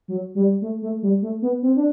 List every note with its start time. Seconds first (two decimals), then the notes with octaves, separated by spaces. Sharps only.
0.08 F#3
0.35 G3
0.62 A3
0.82 A3
1.02 G3
1.22 A3
1.42 B3
1.63 C4
1.76 D4